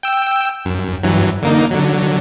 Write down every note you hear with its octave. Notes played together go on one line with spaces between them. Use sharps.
G5 E6
F#2
G2 E3 F#3
D3 A#3 D#4
D3 F#3